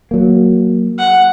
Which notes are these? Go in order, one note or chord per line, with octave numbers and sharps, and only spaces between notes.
F#3 A#3
F#5